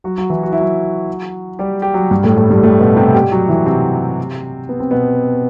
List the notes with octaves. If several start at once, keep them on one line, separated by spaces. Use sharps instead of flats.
F#3 F#4
F#3 F#4
E3 E4
F#4
E4
F#3 F#4
G3 G4
G4
F#3 F#4
G2 G3
A2 A3
A2 A3
G2 G3
A2 A3
B2 B3
C3 C4
G3 G4
F#3 F#4
E3 E4
C3 C4
B3
C4
B2 B3